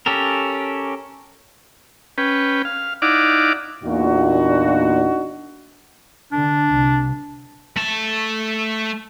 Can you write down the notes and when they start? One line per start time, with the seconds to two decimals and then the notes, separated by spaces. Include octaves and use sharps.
0.06 C#4 G4 A4 A#4
2.18 C#4 B4 G5
2.65 F5
3.02 D#4 E4 D5 F5 F#5 D6
3.84 E2 A#2 D4 D#4 F#4
6.32 D3 D4
6.72 C2
7.77 A3 A5